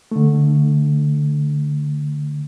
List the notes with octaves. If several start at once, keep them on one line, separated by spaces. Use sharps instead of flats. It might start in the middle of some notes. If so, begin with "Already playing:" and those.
D3 A3